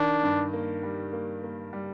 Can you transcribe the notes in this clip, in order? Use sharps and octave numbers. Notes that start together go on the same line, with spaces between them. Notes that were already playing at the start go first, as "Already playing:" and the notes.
Already playing: D#3 D4
G2
A#3
G3
A#3
A#3
G3